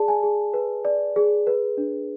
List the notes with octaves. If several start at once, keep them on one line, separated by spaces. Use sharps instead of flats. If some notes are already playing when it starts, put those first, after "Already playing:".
Already playing: G#4 D5 A5
G#5
G#4
B4
D5
G#4
B4
D4